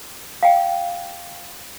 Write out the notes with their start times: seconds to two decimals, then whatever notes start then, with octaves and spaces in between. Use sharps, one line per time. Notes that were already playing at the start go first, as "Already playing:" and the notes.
0.43 F5 G5